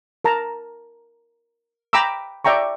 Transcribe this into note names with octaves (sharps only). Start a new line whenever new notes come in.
A#4 A5 A#5
G5 A#5 B5 D6 E6
D5 E5 G5 A#5 C#6